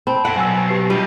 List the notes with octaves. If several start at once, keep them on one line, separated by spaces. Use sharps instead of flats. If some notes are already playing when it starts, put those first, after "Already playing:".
C4 A5 B5
A4 F#5 G5
B2 F#3 G#5 E6
G4 B4 C7
G3 D4 F4 D#5 D#7